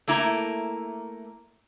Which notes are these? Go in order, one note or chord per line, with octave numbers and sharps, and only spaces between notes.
A3 A#3 E4 A#5